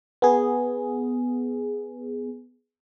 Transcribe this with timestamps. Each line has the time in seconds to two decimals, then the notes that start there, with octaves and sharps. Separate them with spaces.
0.22 B3 G#4